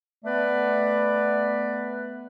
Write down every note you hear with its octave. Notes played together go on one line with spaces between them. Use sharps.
A3 B3 B4 D5